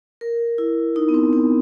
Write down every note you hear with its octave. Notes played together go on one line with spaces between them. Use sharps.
A#4
E4
D#4
B3
C4
B3